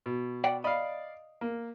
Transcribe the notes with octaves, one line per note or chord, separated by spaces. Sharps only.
B2
D5 F#5 G5
D5 D#5 F5 B5
A#3